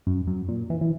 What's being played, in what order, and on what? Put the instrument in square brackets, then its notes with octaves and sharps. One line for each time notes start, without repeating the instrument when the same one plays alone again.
[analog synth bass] F#2
F#2
A#2
E3
E3